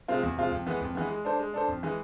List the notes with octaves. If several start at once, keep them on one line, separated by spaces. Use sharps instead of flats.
C3 G#3 C4 F4
E2
C3 G#3 C4 F4
F2
E3 G#3 B3
F2
E3 G#3 B3
G#3
D4 A4 C5
G#3
D4 A4 C5
F2
E3 G#3